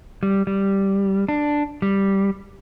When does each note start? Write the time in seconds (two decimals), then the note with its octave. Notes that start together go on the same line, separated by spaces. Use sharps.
0.23 G3
0.47 G3
1.29 D4
1.82 G3